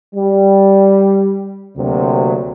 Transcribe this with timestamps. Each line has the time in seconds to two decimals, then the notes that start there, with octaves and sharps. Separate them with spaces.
0.16 G3
1.77 D2 C3 F#3 A#3